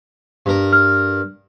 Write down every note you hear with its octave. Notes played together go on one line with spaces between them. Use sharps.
G2 A#4
F6